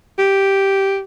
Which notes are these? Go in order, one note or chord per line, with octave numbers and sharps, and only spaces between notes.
G4